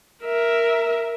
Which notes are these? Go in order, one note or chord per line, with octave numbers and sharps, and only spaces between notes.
A#4 E5